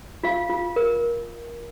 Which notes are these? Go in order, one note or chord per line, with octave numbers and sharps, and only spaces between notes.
F4 F5
F4
A#4